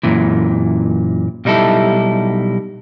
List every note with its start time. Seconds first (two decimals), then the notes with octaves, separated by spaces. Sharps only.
0.03 F#2 A#2 E3
1.45 B1 G3 D#4 E4 A4